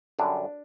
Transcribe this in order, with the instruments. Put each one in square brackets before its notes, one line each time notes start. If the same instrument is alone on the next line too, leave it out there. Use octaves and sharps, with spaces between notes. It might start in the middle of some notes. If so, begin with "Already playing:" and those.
[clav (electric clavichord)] F#2 D3 G3 D4